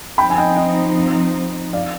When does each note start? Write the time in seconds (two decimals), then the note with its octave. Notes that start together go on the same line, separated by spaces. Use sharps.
0.18 F3 C4 D#4 G5 B5
0.30 G#5
0.38 D#5 G5
0.56 D#5 G5
1.73 D5 F5